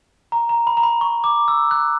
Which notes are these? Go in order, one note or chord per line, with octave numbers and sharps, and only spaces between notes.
A#5
A#5
B5
A#5
B5
C#6
D6
E6
F#6